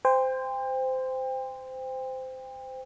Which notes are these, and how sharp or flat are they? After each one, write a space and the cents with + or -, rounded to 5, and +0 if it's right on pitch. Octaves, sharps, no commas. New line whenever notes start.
C5 -20 G5 +30